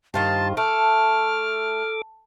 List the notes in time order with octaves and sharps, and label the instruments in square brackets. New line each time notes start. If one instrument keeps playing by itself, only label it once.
[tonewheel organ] G2 G4 [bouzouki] D#3 F4 C5 [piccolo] A5
[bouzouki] A3 [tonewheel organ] A4 D6 [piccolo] F6